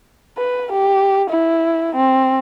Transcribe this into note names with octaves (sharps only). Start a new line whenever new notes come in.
B4
G4
E4
C4